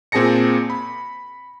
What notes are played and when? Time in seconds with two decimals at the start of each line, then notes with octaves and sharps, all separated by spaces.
0.12 A#2 C4 G#4 A5 A#6 C#7
0.70 B5